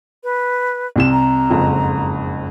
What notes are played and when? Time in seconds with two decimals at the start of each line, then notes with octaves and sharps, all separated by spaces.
0.24 B4
0.96 C2 C3 E7
1.12 A#5
1.50 F#1 F2 G#2